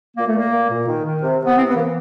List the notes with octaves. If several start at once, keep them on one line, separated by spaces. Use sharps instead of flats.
A#2 A#3
A3
A#2 A#3
A#2
A#2
D#3
D#3
C3
C3
B3
E3 C4
B3
E3 A#3